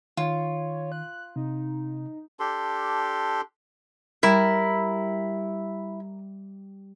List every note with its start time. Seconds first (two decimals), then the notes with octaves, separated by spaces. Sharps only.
0.17 D#3 F4 C#5
0.92 F#6
1.36 C3 D#4
2.40 D4 G4 A4 C6
4.23 G3 E4 A#4